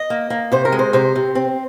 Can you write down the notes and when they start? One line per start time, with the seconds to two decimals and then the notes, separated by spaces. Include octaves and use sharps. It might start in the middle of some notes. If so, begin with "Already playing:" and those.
Already playing: D#5
0.10 A#3
0.30 A#3
0.52 C3 C5
0.65 A#4
0.72 G#3
0.79 C5
0.93 C3 C5
1.16 C3
1.35 C4